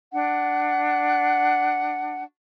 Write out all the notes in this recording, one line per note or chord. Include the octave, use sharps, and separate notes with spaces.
D4 F#5